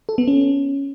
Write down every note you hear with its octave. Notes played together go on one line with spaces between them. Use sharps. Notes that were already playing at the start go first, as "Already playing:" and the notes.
A4
B3
C#4